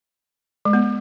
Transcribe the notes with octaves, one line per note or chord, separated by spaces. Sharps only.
G#3
B3